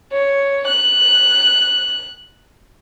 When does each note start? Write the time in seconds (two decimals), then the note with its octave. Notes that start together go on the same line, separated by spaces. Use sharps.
0.12 C#5
0.67 F#6